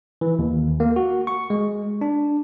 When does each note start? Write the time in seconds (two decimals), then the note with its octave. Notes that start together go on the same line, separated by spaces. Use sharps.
0.21 E3
0.39 D#2
0.80 A#3
0.96 F#4
1.27 C#6
1.50 G#3
2.01 D4